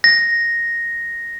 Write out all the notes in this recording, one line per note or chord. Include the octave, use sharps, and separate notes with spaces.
A#6